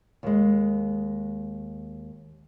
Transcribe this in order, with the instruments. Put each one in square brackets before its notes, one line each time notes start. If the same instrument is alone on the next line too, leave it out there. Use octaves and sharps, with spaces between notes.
[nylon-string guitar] D#2 G#3